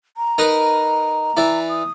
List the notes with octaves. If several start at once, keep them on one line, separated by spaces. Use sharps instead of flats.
A#5
D#4 A#4 B4
E3 E4 D5
D#6